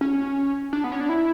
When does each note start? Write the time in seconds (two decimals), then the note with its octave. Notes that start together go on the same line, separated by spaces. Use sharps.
0.01 C#4
0.73 D4
0.84 B3
0.92 C#4
1.00 D4
1.09 E4